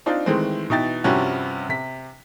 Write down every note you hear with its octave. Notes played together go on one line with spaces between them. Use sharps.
C4 D4 D#4 F4
D#3 E3 G#3 A3 C4
B2 E3 D#4 E5 G5 A6
G2 C3 F3 G3 C#4 F#4
C3 B6